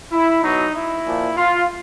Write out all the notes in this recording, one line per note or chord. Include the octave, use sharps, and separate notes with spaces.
E4
B2 F#3 D#4
E4
A#2 F3
F4